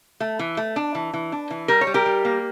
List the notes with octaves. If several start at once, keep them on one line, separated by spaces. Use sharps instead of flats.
A3
E3
A3
D4
E3
E3
D4
E3
G3 A#4
C#5
G3
G4 A#4
G3
A#3